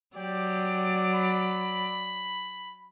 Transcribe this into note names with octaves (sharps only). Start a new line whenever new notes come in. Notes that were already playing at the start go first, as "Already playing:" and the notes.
F#3 G4 D5
B5